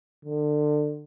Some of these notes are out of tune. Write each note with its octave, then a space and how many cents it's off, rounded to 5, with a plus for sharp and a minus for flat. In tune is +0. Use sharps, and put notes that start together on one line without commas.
D3 +25